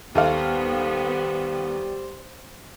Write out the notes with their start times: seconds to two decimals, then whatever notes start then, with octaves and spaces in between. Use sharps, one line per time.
0.15 D#2 G3 B3 A4 C5 F5